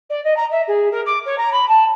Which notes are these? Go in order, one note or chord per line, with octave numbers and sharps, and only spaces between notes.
D5
D#5
A#5
E5
G#4
A#4
D6
C#5
A#5
B5
A5